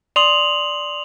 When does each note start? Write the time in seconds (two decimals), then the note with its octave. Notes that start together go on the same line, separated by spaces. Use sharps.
0.16 D5 C6 D#6 F7 F#7